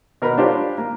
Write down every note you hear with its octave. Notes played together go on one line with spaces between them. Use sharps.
B2 A#4 B4 B5
D4 F4 G4 A#4 C5 C#5
A#3